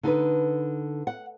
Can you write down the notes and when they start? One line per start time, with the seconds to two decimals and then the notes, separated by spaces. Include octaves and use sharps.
0.03 D3 D#4 A4 B4
1.07 F#5